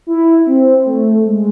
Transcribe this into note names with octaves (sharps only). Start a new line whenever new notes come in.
E4
C4
A3
G#3